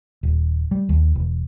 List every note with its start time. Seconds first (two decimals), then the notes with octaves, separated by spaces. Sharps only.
0.23 D#1
0.71 G3
0.89 D#2
1.15 E1